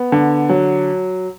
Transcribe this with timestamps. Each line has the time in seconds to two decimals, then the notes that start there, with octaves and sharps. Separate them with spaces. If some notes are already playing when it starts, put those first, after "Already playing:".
Already playing: B3
0.12 D3
0.49 F#3